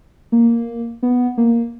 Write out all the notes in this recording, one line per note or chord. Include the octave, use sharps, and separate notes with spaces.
A#3
B3
A#3